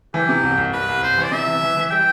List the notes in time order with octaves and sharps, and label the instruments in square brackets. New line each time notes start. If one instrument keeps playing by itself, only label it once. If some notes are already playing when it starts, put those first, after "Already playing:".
[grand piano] E3 [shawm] G4
[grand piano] C3
C2
C2
[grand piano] C2 [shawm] B4
[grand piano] C2
[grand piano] C2 [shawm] C5
[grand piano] E3
[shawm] D5
[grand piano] C3 [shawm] E5
[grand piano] E3
E3
E3
[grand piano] G3 [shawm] G5